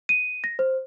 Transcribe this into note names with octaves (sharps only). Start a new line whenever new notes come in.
D#7
A#6
C5